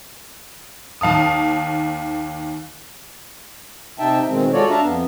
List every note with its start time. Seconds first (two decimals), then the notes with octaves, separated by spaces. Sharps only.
1.01 D#2 F5 A5 D#6
3.99 C3 D#4 E5 G5 A5
4.28 B2 D#3 G#3 C4
4.53 G#3 F4 F#4 A4 C#5 D5
4.70 D4 E5 F5 A5 A#5
4.83 F2 B3